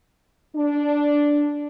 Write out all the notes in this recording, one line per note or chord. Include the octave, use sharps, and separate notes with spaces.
D4